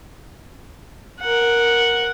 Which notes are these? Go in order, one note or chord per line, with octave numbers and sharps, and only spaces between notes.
A#4 F#5